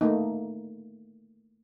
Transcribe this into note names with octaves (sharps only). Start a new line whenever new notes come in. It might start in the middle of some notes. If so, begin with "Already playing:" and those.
A3 A#3 D#4